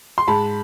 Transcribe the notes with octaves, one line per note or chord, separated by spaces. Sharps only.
C6
G#2 A5 B5